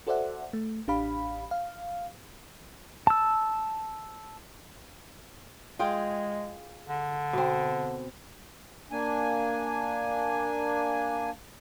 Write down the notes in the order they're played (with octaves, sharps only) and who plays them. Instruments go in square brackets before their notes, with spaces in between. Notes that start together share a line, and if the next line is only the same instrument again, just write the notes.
[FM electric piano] F#4 A4 C5 D5 E5 F#5
A3
A1 D4 G4 F5 B5
F5
[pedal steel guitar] A5 E6
[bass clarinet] G#3 [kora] F4 G#4 G5
[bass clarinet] D3
[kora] B2 C4
[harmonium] A#3 D4 G#5